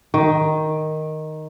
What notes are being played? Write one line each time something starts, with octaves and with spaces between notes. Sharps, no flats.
D#3